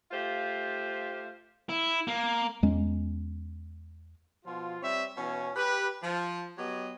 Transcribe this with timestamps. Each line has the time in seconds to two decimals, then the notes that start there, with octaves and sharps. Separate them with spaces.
0.11 A3 F4 G4 C5 F5
1.69 E4
2.08 A#3
2.63 E2 G#3 C#4
4.45 B2 F3 F4
4.82 G3 C4 C#5 E5
5.17 B2 E3 C#4
5.56 G4 B4
6.02 F3
6.57 F#3 B3 G4 D#5